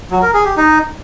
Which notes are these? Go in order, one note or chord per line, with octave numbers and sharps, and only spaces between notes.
F#3
A#4
G#4
G4
D#4